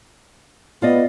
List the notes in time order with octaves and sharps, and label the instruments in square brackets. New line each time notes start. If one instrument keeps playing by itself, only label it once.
[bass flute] B3 [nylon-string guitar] F4 D5 D#5